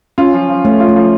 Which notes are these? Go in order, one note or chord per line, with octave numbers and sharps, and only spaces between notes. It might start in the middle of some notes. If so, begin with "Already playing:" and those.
C#4 F4
F3
F3
A3 C#4
F4
A3
F3